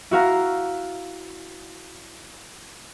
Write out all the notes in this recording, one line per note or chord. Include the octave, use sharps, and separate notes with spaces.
E4 F#4 F5 A#5